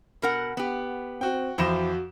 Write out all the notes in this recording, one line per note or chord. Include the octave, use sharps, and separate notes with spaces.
B2 A#4 F#5
B3 G4
C4 F#4 G5
F2 E3 F3 F#4 C5 E7